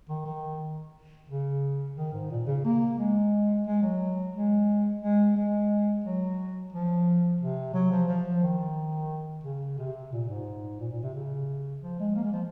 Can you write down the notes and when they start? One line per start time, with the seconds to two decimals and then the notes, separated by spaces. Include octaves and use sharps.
0.10 D#3
0.26 D#3
1.29 C#3
1.97 D#3
2.13 G#2
2.31 A#2
2.47 C#3
2.65 A#3
2.99 G#3
3.66 G#3
3.83 F#3
4.35 G#3
5.02 G#3
5.36 G#3
6.05 F#3
6.73 F3
7.41 C3
7.74 F#3
7.91 F3
8.08 F3
8.43 D#3
9.44 C#3
9.78 C3
10.13 A#2
10.29 G#2
10.80 A#2
10.91 A#2
11.03 C3
11.14 C#3
11.82 F3
12.00 G#3
12.16 A#3
12.24 G#3
12.33 F3